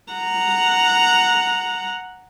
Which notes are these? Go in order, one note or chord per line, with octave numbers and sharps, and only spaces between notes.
F#5 A#5